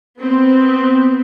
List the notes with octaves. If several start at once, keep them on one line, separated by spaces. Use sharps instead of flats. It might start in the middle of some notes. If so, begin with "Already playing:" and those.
B3 C4